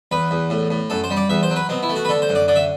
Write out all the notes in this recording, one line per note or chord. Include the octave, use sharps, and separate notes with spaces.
E2 B4
E2
A2
A2
F#2 A4
C5
G3
D5
E2 E5
C5
F#3
B4
B2 C4
E4
A3
F#4
B4
D3 A4
C5
F#2
D5
D3 D5
E5